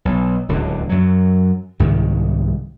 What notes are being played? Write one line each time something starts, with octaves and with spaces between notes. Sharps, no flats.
B1
D1 C#2 D3
F#2 F#3
C2 G#2 D#3